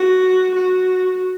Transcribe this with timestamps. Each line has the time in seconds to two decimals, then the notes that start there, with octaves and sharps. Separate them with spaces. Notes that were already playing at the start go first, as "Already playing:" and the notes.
Already playing: F#4
0.55 F#4